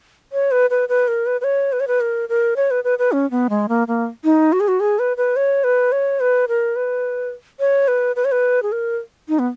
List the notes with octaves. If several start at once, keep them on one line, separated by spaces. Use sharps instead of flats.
C#5
B4
B4
B4
A#4
B4
B4
C#5
B4
C#5
B4
A#4
A#4
C#5
B4
B4
B4
C#4
B3
G#3
A#3
A#3
D#4
F#4
G#4
F#4
G#4
B4
B4
C#5
B4
C#5
B4
A#4
B4
C#5
B4
B4
C#5
B4
G#4
A#4
D#4
B3